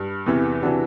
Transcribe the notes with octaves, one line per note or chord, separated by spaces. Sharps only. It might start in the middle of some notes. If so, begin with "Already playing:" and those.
Already playing: G2
E2 C3 E3
C3 E3 D4 F#4